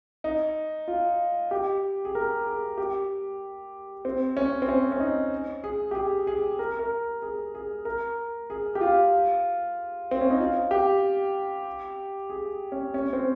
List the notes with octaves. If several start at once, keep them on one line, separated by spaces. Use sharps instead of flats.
D#4
F4
G4
G#4
A#4
G#4
G4
C4
C#4
C4
C#4
C#4
D#4
G#4
G4
G#4
G#4
A#4
A#4
G#4
G#4
A#4
G#4
G4
F4
C4
C#4
D#4
F4
G4
G#4
C#4
C#4
C4